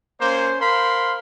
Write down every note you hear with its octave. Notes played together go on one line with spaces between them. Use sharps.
A#3 C#4 C5
A#4 C5 F5 B5 C6